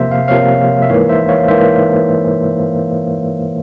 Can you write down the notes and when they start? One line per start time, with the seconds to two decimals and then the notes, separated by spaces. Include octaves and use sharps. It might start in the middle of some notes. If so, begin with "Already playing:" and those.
Already playing: C3 F3 A#3 C5 E5
0.11 F5
0.28 C3 F3 A#3 C#5 F5
0.82 E5
0.89 G#2 E3 A#3 C#5 F5
1.09 C5 E5
1.29 C#5 F5
1.48 G#2 E3 A#3 C5 E5